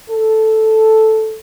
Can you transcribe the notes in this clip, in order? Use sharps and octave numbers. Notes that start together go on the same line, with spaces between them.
A4